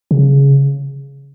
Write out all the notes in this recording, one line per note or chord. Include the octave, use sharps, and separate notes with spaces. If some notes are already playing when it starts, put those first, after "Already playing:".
C#3